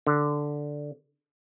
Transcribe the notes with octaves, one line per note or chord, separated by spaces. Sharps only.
D3